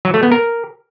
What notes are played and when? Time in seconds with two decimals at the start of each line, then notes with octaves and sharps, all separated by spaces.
0.05 F#3
0.14 A3
0.23 B3
0.32 A#4